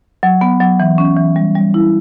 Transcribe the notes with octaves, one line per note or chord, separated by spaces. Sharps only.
F#3
B3
F#3
E3
C#4
E3
G3
G3
E4